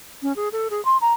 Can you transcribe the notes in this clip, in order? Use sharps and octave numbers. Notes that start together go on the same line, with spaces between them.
C#4
G#4
A4
G#4
C6
A#5